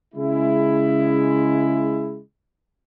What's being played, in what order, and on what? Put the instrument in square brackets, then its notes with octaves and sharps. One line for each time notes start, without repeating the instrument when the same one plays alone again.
[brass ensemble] C#3 G#3 E4